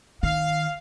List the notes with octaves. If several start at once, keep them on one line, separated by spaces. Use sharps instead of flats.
D#3 F5